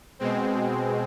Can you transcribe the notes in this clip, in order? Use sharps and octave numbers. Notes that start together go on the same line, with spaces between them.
B2 G#3 C4